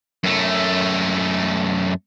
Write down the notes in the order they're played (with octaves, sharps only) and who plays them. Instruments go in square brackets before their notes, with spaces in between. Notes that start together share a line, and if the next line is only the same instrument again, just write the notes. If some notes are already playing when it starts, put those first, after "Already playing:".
[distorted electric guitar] F#2 A3